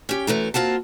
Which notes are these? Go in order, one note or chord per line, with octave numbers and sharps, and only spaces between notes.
C#4 G4
F#2 E3 A3 A#5
A#3 C4 F4 F#4 A5